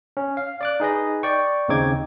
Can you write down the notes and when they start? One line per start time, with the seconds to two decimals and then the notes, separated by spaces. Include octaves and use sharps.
0.17 C#4
0.37 F5
0.61 D5 D6 F#6
0.80 D#4 G#4 B4 D#5
1.23 D5 G5 C#6
1.68 D#2 C#3 C4 D#4 D6 G#6